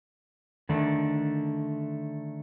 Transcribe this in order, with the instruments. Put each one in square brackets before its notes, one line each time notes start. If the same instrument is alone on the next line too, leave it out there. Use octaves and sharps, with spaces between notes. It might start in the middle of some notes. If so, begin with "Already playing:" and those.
[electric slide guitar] D3 D#3 A3 D4